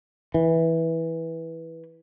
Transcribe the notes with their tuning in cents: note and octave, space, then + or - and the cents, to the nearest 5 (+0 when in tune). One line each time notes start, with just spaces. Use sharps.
E3 -10